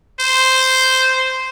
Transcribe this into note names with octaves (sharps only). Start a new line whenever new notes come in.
C5